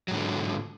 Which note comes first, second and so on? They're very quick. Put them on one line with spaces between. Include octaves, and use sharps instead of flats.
F#3 G#2 D3